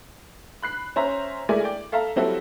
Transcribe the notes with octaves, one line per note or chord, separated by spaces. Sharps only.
B5 F#6 C7
C#4 C5 E5 A#5
G#3 A3 E4 A#4 D5 G#5
D5 G5
A4 E5 F5 A5 A#5
F#3 G3 C4 E4 F#4 A4